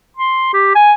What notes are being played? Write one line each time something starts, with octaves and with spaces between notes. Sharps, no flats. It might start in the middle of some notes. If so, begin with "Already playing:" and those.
C6
G4
G#5